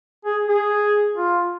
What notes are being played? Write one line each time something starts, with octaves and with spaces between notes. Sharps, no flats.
G#4
G#4
F4